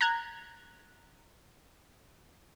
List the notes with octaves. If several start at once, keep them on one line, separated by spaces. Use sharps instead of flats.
A#5 F#6 G#6